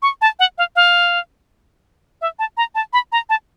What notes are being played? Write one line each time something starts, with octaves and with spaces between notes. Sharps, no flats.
C#6
A5
F#5
F5
F5
E5
A5
A#5
A5
B5
A#5
A5